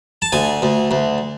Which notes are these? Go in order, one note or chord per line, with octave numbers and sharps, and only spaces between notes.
A5
D2 G#5
D2
D2